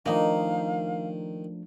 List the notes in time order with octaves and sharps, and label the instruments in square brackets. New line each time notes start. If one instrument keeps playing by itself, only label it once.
[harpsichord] D#3 [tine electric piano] F3 A3 D4 [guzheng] A#3 D#4 [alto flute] F5